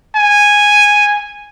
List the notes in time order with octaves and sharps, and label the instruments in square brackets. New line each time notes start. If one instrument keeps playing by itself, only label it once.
[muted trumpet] G#5